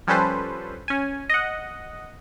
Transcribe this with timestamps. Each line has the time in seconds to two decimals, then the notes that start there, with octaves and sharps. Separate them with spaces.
0.07 F3 G3 C#4 A4 B4 C5
0.88 C#4 G#5
1.30 D#5 F#5